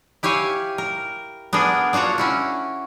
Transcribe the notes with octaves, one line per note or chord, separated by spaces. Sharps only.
E4 G4 C#5 F5 G#5
A#4
B3 D4 G#4 A#4
D4 F4 F#4 C#5 A#5
C#4 E4 F#4